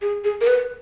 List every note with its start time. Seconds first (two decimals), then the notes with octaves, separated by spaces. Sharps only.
0.02 G#4
0.24 G#4
0.41 A#4
0.47 B4